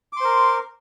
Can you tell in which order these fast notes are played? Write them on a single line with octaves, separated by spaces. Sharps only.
D6 C6 C5 A#4